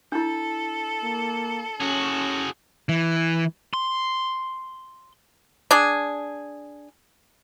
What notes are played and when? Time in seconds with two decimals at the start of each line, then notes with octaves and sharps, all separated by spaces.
0.12 D4 E4 A4
1.02 A#3
1.80 C#4 F#4 G#4
2.89 E3
3.74 C6
5.71 D4 G#4